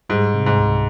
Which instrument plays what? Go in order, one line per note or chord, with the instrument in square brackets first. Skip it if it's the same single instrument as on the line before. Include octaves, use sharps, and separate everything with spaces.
[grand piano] G#2 [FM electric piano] G3
[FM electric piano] C3
[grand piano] G#2
[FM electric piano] C#2